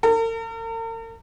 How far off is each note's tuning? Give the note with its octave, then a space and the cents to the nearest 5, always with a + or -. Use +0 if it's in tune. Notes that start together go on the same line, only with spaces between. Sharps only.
A#4 -45